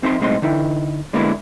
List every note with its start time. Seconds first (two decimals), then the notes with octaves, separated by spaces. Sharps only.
0.02 F2 C4 D#4 E5 C6
0.20 B1 A2 G#3 C4 D#4 C6
0.42 D3 D#4 E4
1.13 D3 G#3 A#3 B3 D4 E4